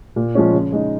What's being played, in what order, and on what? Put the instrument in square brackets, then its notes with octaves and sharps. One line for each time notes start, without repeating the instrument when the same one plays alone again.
[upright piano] A#2
F3 G#3 C#4
C#3
G#3 D#4